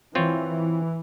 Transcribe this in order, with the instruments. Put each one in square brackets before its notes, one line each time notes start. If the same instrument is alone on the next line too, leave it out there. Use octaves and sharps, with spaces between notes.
[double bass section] E3 [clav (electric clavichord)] C4 F4 C#5